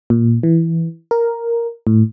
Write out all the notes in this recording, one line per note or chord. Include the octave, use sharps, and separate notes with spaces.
A#2
E3
A#4
A2